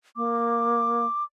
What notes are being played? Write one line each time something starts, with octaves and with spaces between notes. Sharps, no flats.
A#3 D6